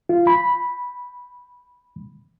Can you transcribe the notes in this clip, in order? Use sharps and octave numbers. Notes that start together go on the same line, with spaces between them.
F4
B5